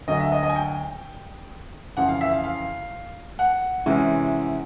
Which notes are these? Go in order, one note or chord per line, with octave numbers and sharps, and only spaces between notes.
D2 D3 F#3 D#5
E5
D#5
D#5
G#5
G5
F2 C#3 E3 F#5
F5
E5
F5
F5
F#5
C3 E3 G#3 C#4